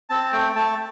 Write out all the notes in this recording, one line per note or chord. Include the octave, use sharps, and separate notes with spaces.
C4 A5
A3 G5
A3 A5